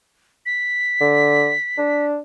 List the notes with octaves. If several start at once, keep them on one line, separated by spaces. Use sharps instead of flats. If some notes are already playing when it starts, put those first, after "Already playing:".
B6
D3
D4